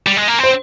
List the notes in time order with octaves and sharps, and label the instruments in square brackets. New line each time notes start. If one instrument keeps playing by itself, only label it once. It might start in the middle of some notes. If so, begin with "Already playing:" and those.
[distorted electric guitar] G3
G#3
A#3
[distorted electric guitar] C4 [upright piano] C5